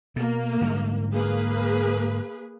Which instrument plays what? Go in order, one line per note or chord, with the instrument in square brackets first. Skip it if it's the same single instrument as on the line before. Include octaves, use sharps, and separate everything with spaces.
[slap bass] B2 [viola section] A#3
[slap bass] G#2 D3 G3
[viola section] A#3 G#4 B4